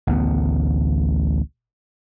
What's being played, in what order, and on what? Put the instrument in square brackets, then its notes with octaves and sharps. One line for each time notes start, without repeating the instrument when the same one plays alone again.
[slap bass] A1 D2 B3